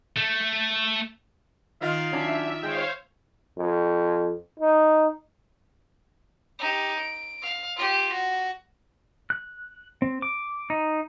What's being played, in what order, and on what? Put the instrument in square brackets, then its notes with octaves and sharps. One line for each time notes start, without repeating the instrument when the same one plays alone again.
[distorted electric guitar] A3
[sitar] D#3 D#4 F4 [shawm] F5
[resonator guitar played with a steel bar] F#3 C#4 D4 [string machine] E5
[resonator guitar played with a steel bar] G#3 [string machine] C5 C#5 F5 [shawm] G5
[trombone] F2
D#4
[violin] D#4 G4
D7
F5
F4 G4
F#4
[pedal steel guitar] F#6
C4
D6
D#4